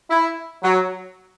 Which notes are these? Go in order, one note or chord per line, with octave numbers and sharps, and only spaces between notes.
E4
F#3